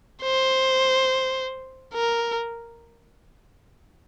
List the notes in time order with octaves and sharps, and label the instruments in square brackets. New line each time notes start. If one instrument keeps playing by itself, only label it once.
[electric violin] C5
A#4